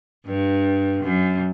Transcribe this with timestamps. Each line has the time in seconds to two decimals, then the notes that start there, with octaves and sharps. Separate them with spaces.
0.26 G2
1.03 F#2